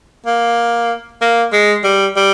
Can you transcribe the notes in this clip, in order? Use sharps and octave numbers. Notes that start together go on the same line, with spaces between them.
A#3
A#3
G#3
G3
G3